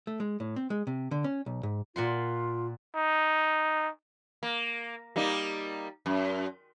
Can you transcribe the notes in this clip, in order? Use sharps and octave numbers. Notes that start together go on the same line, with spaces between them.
A3
G#3
A2
C4
G#3
C3
D3
C#4
B1
G#2
A#2 F4 F#5 C6
D#4
A#3
G3 A#3 D#4
F#2